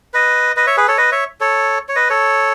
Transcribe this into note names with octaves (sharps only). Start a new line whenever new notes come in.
B4 D#5
B4 D#5
C#5 E5
G#4 B4
A4 C#5
B4 D#5
C#5 E5
A4 C#5
C#5
B4 D#5
A4 C#5